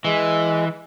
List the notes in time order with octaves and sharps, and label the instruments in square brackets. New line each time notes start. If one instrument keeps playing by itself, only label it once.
[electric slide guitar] E3 [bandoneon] G#3